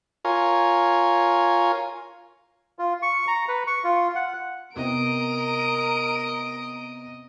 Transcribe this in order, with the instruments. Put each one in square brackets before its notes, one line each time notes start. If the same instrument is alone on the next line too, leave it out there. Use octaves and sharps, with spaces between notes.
[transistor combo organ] F4 A#4 C#5 G#5
[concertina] F4
C#6
A#5
B4
C#6
F4
F#5
[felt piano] C3 B3 C4 [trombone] A#4 [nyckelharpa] D#5 [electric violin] A#5 D7